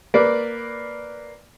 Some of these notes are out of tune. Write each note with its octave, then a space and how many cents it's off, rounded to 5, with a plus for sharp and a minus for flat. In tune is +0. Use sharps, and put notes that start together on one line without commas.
A#3 +0 B4 +0 D5 +0